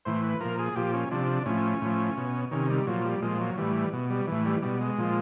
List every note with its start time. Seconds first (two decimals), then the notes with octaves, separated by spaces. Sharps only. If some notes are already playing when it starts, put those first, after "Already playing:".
0.05 A2 E3 C5
0.24 B4
0.40 A#2 F3 A#4
0.59 G#4
0.76 A#2 F3 G4
0.93 C#4
1.11 C3 F3 D4
1.46 A2 F3 C#4
1.82 A2 F3
2.17 B2
2.51 C3 D#3 C#4
2.70 G3
2.87 A#2 F3 F#3
3.05 G3
3.22 A#2 F3 G#3
3.40 F#3
3.58 A2 E3 G3
3.93 B2
4.10 G3
4.27 A2 E3
4.46 G3
4.62 B2 G3
4.81 G#3
4.98 A#2 F3